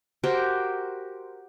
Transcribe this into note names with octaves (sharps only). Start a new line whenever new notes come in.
F#4 G4 A#4 C5